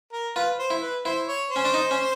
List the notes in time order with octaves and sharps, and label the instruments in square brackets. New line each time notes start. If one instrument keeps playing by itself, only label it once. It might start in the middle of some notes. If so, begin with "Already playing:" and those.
[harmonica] A#4
[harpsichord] F4 [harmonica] B4
[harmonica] C5
[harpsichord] E4
[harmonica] B4
[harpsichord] E4 [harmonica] C5
[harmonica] C#5
C5
[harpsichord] C#4
D4
D#4
C#4